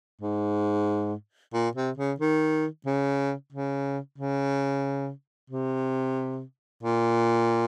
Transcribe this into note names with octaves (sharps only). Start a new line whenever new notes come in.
G#2
A#2
C3
C#3
D#3
C#3
C#3
C#3
C3
A#2